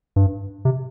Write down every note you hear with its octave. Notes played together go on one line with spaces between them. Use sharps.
G2
C3